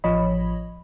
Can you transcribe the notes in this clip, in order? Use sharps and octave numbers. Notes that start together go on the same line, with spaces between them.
A1 F3 C#5 D#5 B5